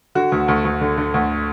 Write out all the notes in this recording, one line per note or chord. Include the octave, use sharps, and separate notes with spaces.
D3 F#4
D2
D2
D2
D3
D3
D2